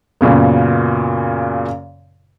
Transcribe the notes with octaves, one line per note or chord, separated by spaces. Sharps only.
F#2 A#2 C#3 B3